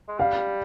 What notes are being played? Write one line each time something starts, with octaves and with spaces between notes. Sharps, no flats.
G#3
G3 F5